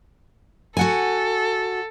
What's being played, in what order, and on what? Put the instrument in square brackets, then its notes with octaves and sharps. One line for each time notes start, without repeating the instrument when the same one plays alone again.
[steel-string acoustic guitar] F#4 F#5 G#5 [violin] A4